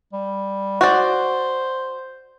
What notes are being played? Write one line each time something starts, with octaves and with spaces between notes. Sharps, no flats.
G3
F#4 C5 D5